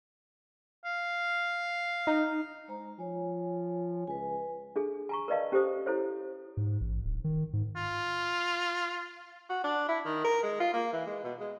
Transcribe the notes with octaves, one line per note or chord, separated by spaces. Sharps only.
F5
D#4
G#3 C5 A#5
F3 C#5 G#5
C#2 B4 G#5
D4 G#4 A4
G#5 A#5 C#6
A#4 B4 D5 D#5 F5 A5
C#4 G4 A4 C5 D#6
E4 A4 C5 C#5
G#2
A1
D1
D#3
G#2
F4
F#4
D4
E4
D#3
A#4
G#3
F4
A#3
E3
G#3
B2
G#3